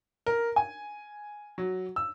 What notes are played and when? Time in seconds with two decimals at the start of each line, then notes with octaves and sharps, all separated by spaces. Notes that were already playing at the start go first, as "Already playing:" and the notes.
0.26 A#4
0.56 G#5
1.58 F#3
1.96 E6